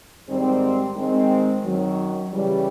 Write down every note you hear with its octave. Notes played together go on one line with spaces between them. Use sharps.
G#2 D#3 G3 C4
D#3 G#3 C4
F#2 D#3 F#3
C#3 E3 G3